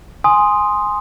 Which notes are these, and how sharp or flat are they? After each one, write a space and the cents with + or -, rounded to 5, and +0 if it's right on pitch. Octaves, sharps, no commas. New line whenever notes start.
G#5 +0 C6 +0 D#6 +0